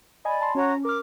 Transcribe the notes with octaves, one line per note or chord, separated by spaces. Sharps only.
D5 D#5 G#5 B5
A5 C6
C#4 F#4 C#5 A#5
A#4 D6 F6